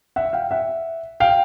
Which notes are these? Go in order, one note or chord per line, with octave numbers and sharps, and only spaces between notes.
E5 F#5
F5 G5
E5 F#5
F5 G5